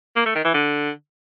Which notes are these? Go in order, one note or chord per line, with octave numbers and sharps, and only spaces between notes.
A#3
A3
D#3
E3
D3